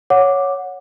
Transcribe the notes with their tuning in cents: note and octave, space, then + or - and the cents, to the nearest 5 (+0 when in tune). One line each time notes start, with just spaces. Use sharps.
C#5 +0 F#5 -20 D6 +0